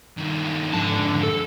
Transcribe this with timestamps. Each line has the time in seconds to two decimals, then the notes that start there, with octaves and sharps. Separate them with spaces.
0.17 G2 D#3
0.74 F2 G#2 D3 A5
1.23 A4